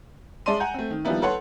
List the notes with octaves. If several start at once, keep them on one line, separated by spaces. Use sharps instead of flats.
G#3 D5 E5 A5 C6 D#7
F#5 G#5 A#5 G6
A3 C4
D#3
D#3 F3 G3 A#3 B3 E4
A4 B4 C#5 F#5 C6